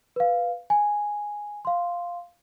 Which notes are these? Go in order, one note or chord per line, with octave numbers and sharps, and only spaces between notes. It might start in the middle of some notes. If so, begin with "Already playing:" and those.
B4 F5
G#5
F5 C6